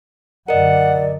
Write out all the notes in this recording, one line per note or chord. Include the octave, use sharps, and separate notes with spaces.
F#2 D3 A#4 D5 D#5 F#5